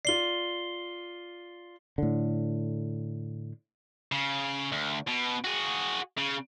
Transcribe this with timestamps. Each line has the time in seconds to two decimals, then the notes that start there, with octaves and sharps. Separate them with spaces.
0.05 F4 D5 C7 G7
1.98 A2 D3
4.12 C#3
4.72 D2
5.08 B2
5.44 F#4 G#4
6.18 C#3